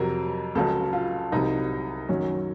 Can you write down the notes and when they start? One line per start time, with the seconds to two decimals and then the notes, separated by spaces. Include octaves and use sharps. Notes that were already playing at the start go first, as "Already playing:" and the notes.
Already playing: F2 C3 F#3 A#4
0.55 C#2 C#3 F#3 A4
0.93 F4
1.32 C2 C3 F#3 D#4
2.09 F#2 D#3 F#3 C#4